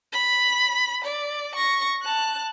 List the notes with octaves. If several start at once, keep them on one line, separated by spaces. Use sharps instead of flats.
B5
D5
C#6 A#6
A5 F#6